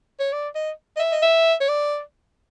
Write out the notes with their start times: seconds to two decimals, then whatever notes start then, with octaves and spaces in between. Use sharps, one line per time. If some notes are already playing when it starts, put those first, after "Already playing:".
0.20 C#5
0.33 D5
0.55 D#5
0.96 D#5
1.00 E5
1.12 D#5
1.22 E5
1.60 C#5
1.69 D5